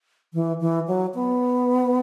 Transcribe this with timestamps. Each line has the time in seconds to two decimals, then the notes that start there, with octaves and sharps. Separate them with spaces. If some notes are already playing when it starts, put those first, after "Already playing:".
0.34 E3
0.61 E3
0.87 F#3
1.15 B3